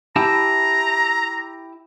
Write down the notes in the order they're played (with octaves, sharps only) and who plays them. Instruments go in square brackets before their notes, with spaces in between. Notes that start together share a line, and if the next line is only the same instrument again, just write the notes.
[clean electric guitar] E4 G4 A5 [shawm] A#5